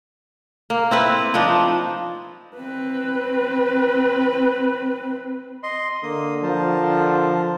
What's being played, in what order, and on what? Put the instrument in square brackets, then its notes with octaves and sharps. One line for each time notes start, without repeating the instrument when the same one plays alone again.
[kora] A#3
C4 E4 B4
F3 C4 D4 D#4
[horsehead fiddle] C4 B4
[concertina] D#5 C6
[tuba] D3 [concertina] A#3 D#6
[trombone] F3 [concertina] A#4 C5 A5
[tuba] D3